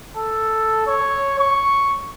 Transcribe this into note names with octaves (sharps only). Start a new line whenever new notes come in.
A4
C#5
C#6